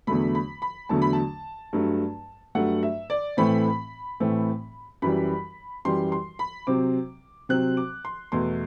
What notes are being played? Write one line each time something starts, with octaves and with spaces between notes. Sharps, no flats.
E2 D3 F#3 A3 B5
B5
B5
E2 D3 F#3 A3 A5
B5
A5
G2 F#3 A3
G2 F#3 A3 F#5
E5
D5
A2 E3 A3 C4 B5
A2 E3 A3 C4
F#2 E3 G3 B5
F#2 E3 G3 C6
C6
B5
C3 F#3 C4 D6
C3 F#3 C4 F#6
D6
C6
E2 B2 A3 C6